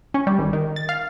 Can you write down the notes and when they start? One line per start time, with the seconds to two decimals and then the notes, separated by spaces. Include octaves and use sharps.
0.14 C#4
0.27 G3
0.39 G#1
0.53 D#3
0.76 A6
0.89 F5